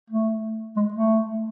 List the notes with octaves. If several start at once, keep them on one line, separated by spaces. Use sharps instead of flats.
A3
G#3
A3